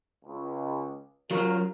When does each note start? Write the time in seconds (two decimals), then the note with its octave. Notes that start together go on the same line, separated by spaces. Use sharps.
0.25 C#2
1.31 F#3 C#4 F4 A#4